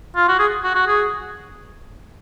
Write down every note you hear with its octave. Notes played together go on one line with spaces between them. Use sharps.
F4
F#4
G#4
F#4
F#4
G#4